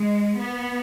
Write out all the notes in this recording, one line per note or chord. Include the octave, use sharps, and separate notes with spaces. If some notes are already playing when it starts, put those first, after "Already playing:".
Already playing: G#3
B3